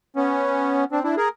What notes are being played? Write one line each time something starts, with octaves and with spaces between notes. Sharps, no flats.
B3 C#4
C4 D4
D4 E4
G#4 A#4